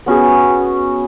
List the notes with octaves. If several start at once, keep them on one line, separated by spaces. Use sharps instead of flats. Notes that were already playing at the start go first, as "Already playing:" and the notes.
B3 C#4 F#4 G#4